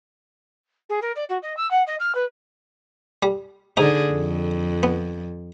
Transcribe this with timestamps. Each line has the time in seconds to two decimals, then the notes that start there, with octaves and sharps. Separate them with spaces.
0.89 G#4
1.02 A#4
1.15 D5
1.29 F#4
1.42 D#5
1.56 E6
1.70 F#5
1.86 D#5
1.99 F6
2.14 B4
3.23 G3
3.77 G#2 D3 D#4 G#4
4.12 F2
4.83 B3